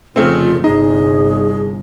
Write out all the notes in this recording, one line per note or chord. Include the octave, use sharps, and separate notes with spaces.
F1 C#3 A3 C4 F4
G1 C2 D#4 G#4 D#5